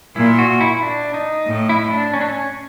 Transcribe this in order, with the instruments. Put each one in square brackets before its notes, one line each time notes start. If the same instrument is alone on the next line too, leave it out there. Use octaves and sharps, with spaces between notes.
[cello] A#2 [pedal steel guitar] E4
[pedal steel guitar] F#4
E4
D4
D#4
[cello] A2
[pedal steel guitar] E4
D4
C#4
D4
C#4